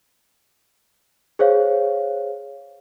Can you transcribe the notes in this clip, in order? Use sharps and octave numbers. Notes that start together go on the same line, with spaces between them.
G#4 C5 C#5 F5